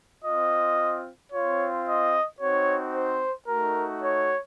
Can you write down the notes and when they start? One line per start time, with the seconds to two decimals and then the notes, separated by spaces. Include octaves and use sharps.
0.25 C4 F4 D#5
1.32 C4 F4 C#5
1.87 D#5
2.41 C4 D#4 F#4 C#5
2.95 C5
3.48 A3 D#4 F#4 A#4
4.02 C#5